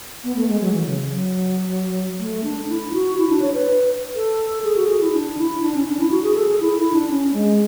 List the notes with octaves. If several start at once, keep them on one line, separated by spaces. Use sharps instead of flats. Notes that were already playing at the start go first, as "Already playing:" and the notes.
B3
A3
G#3
F#3
E3
C#3
F#3
A3
D4
E4
F#4
E4
D4
C#5
B4
A4
G#4
F#4
G#4
E4
D4
E4
D4
C#4
D4
E4
F#4
G#4
A4
G#4
E4
E4
D4
C#4
G#3